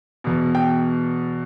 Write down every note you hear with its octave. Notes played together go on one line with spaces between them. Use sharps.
E2 B2
G5